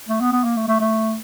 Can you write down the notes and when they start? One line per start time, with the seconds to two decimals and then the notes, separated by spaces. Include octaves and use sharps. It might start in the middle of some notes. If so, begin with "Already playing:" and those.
0.09 A3
0.21 B3
0.32 B3
0.44 A#3
0.57 A3
0.68 A3
0.80 A3